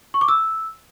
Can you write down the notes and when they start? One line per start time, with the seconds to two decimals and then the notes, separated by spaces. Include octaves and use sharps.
0.14 C#6
0.21 D6
0.28 E6